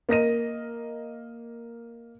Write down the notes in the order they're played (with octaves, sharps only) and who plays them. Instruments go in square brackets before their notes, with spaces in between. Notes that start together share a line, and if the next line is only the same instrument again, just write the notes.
[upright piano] A#3 D#5 A#6 D#7